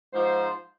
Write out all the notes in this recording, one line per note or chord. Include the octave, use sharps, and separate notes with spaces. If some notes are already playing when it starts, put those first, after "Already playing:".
G#2 F3 C5